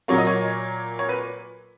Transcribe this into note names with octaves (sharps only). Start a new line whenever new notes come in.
A#2 F#3 A#3 C#5
D#5
C#5
C#5
B4